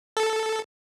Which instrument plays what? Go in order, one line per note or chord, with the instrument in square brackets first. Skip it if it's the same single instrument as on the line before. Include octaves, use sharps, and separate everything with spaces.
[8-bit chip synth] A4